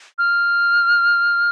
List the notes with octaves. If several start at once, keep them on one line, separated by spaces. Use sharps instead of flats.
F6